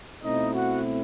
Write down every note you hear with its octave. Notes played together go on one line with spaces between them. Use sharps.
B2 A3 C4 D#4 E4 D#5
F#4 F#5